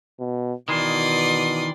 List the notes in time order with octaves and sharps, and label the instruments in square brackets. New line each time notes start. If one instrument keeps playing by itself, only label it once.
[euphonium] B2
[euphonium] B2 [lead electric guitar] D#3 E3 [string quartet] D5 D#6 [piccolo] C6